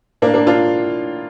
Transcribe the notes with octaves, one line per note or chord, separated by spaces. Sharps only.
A2 A#3 D4
A#3 D4
D4 F4